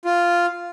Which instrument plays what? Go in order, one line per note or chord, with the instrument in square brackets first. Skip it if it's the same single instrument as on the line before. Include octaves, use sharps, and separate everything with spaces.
[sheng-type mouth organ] F4